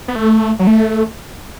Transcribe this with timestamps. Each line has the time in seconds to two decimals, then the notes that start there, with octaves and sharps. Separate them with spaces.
0.08 B3
0.16 A3
0.59 F#3
0.67 A3